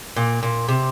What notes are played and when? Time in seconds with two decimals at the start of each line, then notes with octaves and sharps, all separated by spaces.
0.16 A#2
0.43 A#2
0.68 C3